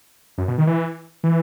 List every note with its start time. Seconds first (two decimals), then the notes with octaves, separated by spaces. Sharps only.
0.38 F#2
0.48 B2
0.58 D#3
0.67 E3
1.24 E3